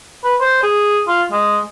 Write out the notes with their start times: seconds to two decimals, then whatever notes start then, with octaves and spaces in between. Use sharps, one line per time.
0.24 B4
0.41 C5
0.63 G#4
1.08 F4
1.32 G#3